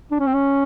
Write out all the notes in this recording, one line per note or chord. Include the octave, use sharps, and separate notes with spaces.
D4
C#4
C4
C#4